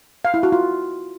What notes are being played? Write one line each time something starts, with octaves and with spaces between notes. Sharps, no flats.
F5
E4
F#4
F4